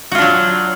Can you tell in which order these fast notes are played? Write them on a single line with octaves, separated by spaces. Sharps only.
F#4 F4 D4 F#3